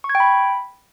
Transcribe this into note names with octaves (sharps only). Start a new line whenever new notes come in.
C#6
G#6
G5
B5